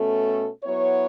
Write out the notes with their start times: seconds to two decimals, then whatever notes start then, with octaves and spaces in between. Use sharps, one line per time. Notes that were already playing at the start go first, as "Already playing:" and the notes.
Already playing: B2 A3 C#4 A4
0.63 F#3 B3 E4 C#5